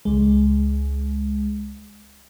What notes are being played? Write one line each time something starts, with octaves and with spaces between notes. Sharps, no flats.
C#2 G#3